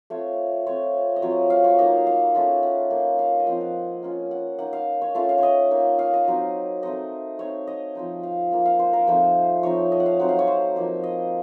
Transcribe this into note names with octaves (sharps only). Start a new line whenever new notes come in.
A3 C4 F4 C#5
A3 C4 F4 C#5
D#5
F#3 C4 F4 C#5
F5
C#5
A#3 D#4 D#5
F5
A3 C#4 F4
F#5
A#3 D#4
F5
D#5
F3 C4 F4 F5
F#5
A#3 C#4 F4
F#5
A#3 D#4 F#5
F5
C#5
A3 C#4 F4 F5
F5
C#5 D#5
A#3 D#4
F5
D#5
F#3 C4 D#4
A3 C4 D#4 D#5
A3 C4 D#4 C#5
D#5
F3 C4 D#4
F5
A#3 F4 F5
F5
C5
A#4
F3 A3 C4 D#4 C5
F3 C4 D#4 C#5
D#5
F#5
F5
F#3 C4 D#4 F#5
F5
C#5
C5
F3 A#3 D#4
D#5